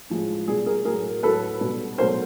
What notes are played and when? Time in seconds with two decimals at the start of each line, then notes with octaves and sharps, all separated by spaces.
0.10 A2 F3 G#3
0.48 B2 G3 G#4
0.66 G#4 A#4
0.85 A2 F#3 A3 G#4 A#4
1.22 A2 F#3 A3 A4 B4
1.61 B2 G3
1.98 B2 F#3 A3 A#4 C5